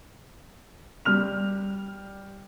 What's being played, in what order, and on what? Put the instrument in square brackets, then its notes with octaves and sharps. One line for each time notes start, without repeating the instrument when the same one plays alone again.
[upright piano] G3 F6 F7